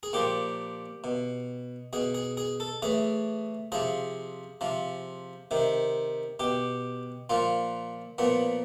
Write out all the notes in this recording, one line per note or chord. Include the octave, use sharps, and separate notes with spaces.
G#4
A#2 F3 G4
B2
B2 G#4
G#4
G#4
A4
A2 E3 G#4
C3 F3 G#4
C3 F3
C3 D#3
B2 G4
A#2 F3 F4
A#2 F3 B3